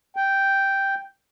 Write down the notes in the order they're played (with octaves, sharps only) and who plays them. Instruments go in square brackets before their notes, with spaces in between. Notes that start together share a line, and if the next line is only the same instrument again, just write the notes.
[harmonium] G5